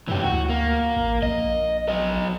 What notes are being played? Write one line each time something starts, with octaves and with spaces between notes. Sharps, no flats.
F#2 E3 G4
D2 F#4
A#3
A1
A#1 D#5
F#3 D#5